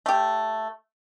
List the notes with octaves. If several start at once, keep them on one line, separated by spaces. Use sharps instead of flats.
A3 G4